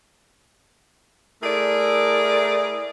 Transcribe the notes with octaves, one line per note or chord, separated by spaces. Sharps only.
A3 E4 G#4 A#4 D5